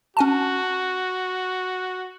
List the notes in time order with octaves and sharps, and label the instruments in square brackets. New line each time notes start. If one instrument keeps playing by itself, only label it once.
[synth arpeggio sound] C#4 G#5 A5 [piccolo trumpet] F#4